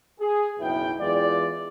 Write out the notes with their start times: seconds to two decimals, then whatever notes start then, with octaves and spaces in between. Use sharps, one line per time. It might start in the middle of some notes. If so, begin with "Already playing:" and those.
0.20 G#4
0.59 F#1 B1 B3 E4 G5
1.00 E2 G#3 F4 D5